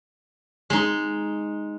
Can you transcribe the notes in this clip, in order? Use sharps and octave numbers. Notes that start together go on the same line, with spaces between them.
G#3 D#4